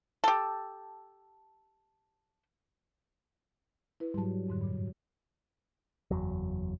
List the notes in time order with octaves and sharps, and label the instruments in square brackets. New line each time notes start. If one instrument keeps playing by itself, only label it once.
[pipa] G4 A4
[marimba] E4 B4
[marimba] G#2 A5 [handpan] F#3 G3
[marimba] F2 G#2 D3
G2 A#2
[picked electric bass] F#1 E2 F#3